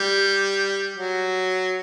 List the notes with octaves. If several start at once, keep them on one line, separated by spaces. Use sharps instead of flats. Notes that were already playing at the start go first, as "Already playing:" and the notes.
Already playing: G3
F#3